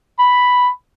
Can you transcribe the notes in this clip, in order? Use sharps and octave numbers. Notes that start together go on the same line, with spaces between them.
B5